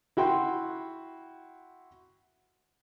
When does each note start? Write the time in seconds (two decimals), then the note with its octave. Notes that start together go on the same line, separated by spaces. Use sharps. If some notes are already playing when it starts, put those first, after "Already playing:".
0.17 E4 F#4 G5 C6